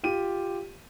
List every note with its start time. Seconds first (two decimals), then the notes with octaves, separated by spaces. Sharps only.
0.03 F4 G4 D#7